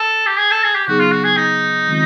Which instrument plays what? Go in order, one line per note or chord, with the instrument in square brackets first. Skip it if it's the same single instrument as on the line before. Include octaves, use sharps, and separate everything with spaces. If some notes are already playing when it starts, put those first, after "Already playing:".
Already playing: [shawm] A4
G4
G#4
A4
G#4
G4
[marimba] C#3 F#3 B3 D#4 G#4 [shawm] F#4
[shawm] F4
F#4
G#4
D#4
[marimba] D#3 G#3 C4 F4